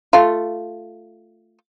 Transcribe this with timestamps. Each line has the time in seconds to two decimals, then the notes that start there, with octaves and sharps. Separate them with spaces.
0.13 A3 F4